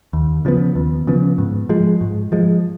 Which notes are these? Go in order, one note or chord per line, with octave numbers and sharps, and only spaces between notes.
D#2
C#3 F3 B3
D#2
C#3 F3 B3
G#2
F3 G#3
G#2
F3 G#3